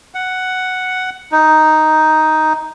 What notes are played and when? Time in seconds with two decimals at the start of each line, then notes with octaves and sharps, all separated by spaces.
0.15 F#5
1.32 D#4